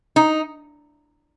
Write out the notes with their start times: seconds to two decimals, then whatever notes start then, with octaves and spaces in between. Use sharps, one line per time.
0.16 D#4